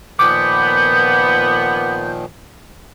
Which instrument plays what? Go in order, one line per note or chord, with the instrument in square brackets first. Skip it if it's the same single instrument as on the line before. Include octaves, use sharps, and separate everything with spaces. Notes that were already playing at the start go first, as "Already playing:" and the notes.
[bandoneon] A#2 D#3 F3 [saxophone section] B3 [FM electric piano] D6 [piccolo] G6